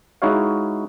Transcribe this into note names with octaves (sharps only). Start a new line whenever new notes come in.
G#3 D#4 E4 F#4 C#5 F5